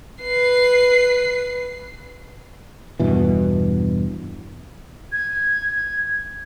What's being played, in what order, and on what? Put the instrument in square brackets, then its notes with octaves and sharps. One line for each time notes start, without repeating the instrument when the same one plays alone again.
[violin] B4 C7
[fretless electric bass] E2 G2 B2 E3
[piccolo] G#6